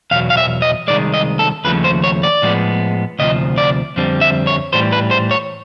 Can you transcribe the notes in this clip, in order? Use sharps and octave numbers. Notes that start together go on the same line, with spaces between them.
E2 B2 F#3 F5
F5
E5
D#5
C2 C3 D#3 G#3 D5
D#5
A4
D#2 C#3 F3 A3 B4
C5
C#5
D5
A2 F3 G#3 B3
D2 C3 F3 D#5
D5
F2 D3 G3 C4
E5
C#5
A2 E3 G3 C5
B4
C5
C#5